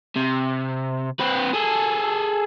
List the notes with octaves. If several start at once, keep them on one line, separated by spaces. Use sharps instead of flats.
C3
C4 B4
G#4 A4